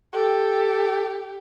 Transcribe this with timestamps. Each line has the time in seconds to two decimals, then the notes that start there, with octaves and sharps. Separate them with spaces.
0.13 G4 A4